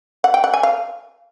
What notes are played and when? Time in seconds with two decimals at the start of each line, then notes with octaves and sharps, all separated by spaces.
0.24 F#5
0.34 G5
0.44 F#5
0.54 G#5
0.63 F5